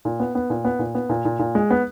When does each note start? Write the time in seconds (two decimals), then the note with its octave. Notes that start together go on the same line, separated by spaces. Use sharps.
0.05 A#2
0.20 B3
0.35 B3
0.50 A#2
0.65 B3
0.79 A#2
0.95 B3
1.09 A#2
1.25 A#2
1.39 A#2
1.55 G#3
1.70 B3